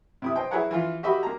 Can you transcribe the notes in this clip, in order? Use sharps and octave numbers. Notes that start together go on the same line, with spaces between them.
C3 E4 D#6
C5 D#5 G5
E4 G#4 B4 C#5 F#5 A#5
E3 F4
F#4 G4 D#5 E5 B5
A#3 A#5